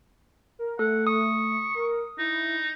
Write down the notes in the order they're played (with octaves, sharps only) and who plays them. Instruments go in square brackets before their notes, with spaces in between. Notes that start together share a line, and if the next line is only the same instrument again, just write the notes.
[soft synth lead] A#4
[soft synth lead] A3 [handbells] A4 [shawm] F#5
[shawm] C#6 [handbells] D#6
[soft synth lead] A#4
[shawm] D#4 [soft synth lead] E4